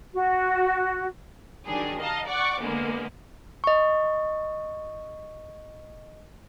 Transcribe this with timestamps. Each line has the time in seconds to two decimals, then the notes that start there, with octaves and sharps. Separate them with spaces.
0.15 F#4
1.66 D#3 F#3 G3 D4 G#4
1.99 D#5 F5 A5 A#5
2.28 D5 F#5 C#6 D6
2.61 D3 G#3 A#3 B3
3.64 D#5 C#6